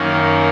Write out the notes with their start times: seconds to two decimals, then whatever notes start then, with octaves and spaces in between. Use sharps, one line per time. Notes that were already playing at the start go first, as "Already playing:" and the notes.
Already playing: F#2 D#3 A#3 C#4